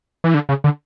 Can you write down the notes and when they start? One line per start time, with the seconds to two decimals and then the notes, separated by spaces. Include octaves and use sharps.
0.24 E3
0.34 D3
0.49 C#3
0.64 D3